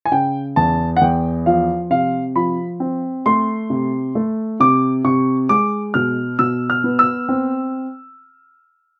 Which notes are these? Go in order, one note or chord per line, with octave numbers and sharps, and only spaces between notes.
G#5
C#3 G5
E2 A5
F#5
E2 G5
F3 F5
C3 F5
F3 B5
C4
A3 C6
C3
A3
C3 D6
C3 C#6
G#3 D6
B2 F6
B2 E6
F6
B3
E6
C4